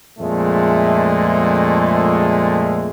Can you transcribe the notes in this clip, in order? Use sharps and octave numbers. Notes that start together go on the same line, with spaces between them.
F2 A#2 G#3 A3